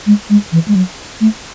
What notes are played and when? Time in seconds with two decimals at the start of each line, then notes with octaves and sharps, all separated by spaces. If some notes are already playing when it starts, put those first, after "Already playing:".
0.06 G#3
0.30 G#3
0.52 E3
0.68 G#3
0.75 F#3
1.21 A3